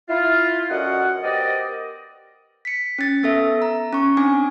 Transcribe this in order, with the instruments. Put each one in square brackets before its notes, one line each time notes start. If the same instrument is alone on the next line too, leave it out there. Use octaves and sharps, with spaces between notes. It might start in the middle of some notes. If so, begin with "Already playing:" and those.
[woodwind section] E4 F4
F#2 D3 F#4 D#5 F#5
B3 G4 A#4 C5 D5 D#5
[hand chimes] B6 C#7
C#4 A6
B3 A4 E5
A#5
C#4 C#6
C4 D4 G#5 D6